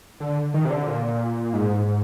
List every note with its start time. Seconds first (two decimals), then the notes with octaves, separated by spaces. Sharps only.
0.20 D3
0.54 D#3
0.65 C3
0.70 D3
0.87 A#2
1.53 G#2